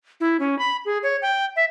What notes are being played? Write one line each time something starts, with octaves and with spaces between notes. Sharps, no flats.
E4
C#4
B5
G#4
C#5
G5
E5